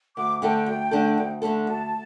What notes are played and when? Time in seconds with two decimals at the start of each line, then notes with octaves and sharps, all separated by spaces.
0.17 D2 D6
0.42 D3 A3 D4 A4 G5
0.66 D2
0.91 D3 A3 D4 A4
1.18 D2
1.42 D3 A3 D4 A4
1.67 D2 A5